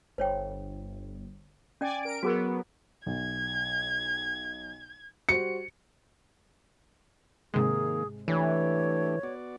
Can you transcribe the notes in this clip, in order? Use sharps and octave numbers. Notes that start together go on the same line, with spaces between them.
G1 C5 C#5 G5
C#4 D5 G5 G#5
A#4 D7
F#3 B3 F#4 G#4 A#4
B1 G#6
G3 F#4 C5 C#7
G#2 C3 D#3 G#3 A#3 G#4
E3 A3 D4 G4 C#5
B3 F#4 D5